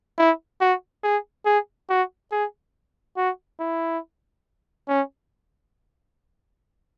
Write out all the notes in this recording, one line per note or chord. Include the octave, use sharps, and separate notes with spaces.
E4
F#4
G#4
G#4
F#4
G#4
F#4
E4
C#4